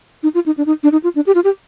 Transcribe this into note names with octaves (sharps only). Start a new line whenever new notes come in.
D#4
F4
D#4
D4
D#4
D4
D#4
F4
D4
G4
F4
G4